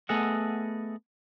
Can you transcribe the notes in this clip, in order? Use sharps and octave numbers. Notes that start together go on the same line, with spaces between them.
A3 B3 G#4 A4 D#5 F#5